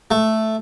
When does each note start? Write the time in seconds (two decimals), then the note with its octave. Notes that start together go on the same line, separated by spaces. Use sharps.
0.11 A3